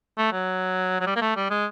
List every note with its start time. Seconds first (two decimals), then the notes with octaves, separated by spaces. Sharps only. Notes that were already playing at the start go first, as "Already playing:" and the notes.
0.17 A3
0.32 F#3
1.00 F#3
1.07 G3
1.16 A#3
1.22 A3
1.36 G3
1.50 G#3